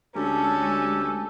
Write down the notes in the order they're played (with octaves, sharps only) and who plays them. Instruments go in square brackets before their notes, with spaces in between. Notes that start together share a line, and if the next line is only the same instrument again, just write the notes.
[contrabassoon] D2 [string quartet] G#3 C#4 [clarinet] G4 [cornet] A4